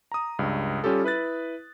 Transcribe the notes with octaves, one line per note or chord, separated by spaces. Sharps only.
A#5 D#6
C#2 G2
G3 C#4 F4 G4 A4
E4 B4 F#6 A6